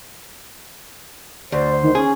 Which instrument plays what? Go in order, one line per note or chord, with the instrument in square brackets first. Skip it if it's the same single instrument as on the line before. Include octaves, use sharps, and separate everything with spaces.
[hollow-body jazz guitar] D2 [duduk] C5 [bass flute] D5
[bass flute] D#3
[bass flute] C#4 [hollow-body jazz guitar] G#4